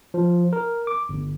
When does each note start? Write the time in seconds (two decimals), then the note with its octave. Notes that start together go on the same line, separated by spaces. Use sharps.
0.14 F3
0.53 A#4
0.87 D6
1.09 G1